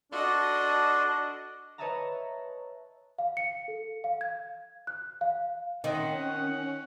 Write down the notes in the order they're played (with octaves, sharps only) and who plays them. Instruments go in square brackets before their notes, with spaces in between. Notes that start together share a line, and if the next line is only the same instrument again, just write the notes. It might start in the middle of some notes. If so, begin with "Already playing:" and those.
[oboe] D4 [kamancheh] F#4 D#5 [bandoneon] A4 D5 C6
[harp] B4 C#5 D#5 E5 A5 A#5
[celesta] F5
C#7
A4
F5
G#6
F#6
F5
[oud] D#3 C4 [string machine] C#4 [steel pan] D#5 [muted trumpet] F#5